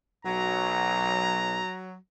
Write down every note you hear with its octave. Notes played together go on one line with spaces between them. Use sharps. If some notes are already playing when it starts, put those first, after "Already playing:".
B1 F#3 A#5